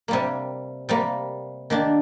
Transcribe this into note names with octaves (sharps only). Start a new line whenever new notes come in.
C3 G3 A#3
C3 G3 A#3
D#3 A#3 D4